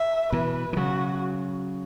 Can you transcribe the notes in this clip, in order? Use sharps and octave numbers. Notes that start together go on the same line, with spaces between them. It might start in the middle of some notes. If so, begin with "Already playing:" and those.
Already playing: E5
B2 E3 B4
E3
C#3 F#3 F#4